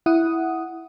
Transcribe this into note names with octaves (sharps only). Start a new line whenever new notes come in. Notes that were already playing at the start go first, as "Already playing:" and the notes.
E4 F#5 D#6